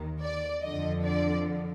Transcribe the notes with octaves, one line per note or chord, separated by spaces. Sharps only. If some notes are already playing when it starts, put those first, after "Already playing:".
Already playing: D#2 D#3
D5
F2 D3 F3 D#5
D5